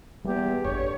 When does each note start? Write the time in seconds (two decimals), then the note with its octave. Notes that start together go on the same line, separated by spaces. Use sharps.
0.24 E2 G3 A#3 G4
0.65 G#1 F2 D3 C#5